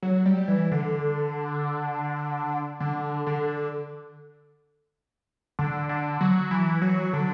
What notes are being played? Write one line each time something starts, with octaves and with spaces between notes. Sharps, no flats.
F#3
G3
E3
D3
D3
D3
D3
D3
F#3
E3
F#3
D3